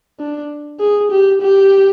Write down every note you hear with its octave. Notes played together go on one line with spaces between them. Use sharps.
D4
G#4
G4
G4